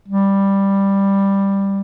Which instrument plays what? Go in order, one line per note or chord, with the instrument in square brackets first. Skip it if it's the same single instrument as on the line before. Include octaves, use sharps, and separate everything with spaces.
[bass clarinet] G3